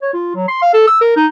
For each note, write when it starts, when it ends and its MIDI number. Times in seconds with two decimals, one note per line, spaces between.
0.02 0.11 73
0.14 0.31 65
0.35 0.45 54
0.48 0.60 84
0.62 0.72 77
0.74 0.86 69
0.87 0.97 88
1.01 1.14 70
1.17 1.27 63